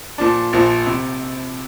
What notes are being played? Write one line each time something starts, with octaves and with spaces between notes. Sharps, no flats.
A#2 F3 D4
A#1 A#2 F3
C3